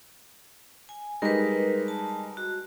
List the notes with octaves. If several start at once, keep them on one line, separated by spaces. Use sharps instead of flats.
G#5
G3 G#3 D#4 A#4 B4
A5
F#4